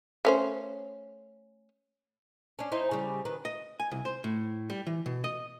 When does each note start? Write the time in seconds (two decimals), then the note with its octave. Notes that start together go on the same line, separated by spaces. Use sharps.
0.25 A3 C#4 C5
2.59 C#4 D4
2.72 D#4 E4 C5
2.91 C#3 G3
3.25 D#3 B4
3.45 D#5
3.80 G#5
3.91 C2
4.05 C5
4.24 A2
4.70 G3
4.87 E3
5.06 B2
5.24 D#5